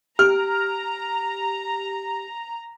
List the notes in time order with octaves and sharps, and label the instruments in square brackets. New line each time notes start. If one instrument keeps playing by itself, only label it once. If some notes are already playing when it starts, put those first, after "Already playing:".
[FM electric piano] G4 [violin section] A#5 [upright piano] F6